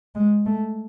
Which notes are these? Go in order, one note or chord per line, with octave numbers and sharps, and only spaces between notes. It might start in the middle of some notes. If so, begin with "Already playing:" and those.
G#3
A3